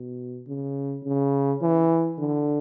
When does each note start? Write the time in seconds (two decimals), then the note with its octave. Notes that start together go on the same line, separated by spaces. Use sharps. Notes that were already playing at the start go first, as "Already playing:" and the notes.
Already playing: B2
0.47 C#3
1.04 C#3
1.62 E3
2.19 D3